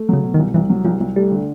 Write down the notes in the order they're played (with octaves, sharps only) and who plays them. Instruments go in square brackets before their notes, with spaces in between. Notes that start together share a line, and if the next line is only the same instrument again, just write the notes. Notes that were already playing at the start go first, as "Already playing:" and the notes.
Already playing: [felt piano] A3
[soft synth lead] C#3 [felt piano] F#3
[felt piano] B2
[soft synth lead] D#3
[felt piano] C2
[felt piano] C2 [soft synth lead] E3
[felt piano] F#3
[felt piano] C2 [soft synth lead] F3
[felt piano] C2
[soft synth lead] G3 [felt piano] A3
[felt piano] D3